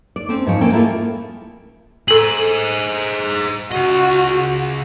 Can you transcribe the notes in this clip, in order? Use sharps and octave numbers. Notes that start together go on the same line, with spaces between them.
D5
C4 C#4 A4 C5
G#2 F3 C#5
A2 A#3 C#4 A4 G5
A3 A#3 E4 F4 G#4 A4
G#4 A4 C5 F#7
C#3 F#4 D#5